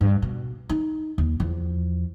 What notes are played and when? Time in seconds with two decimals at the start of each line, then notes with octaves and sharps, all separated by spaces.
0.01 G2
0.22 B2
0.69 D#4
1.18 D#2
1.40 E2 F3